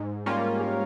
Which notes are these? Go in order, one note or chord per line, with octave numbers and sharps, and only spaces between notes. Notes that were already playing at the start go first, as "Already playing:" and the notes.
Already playing: G#2
G3 A#3 C#4 F4
G#2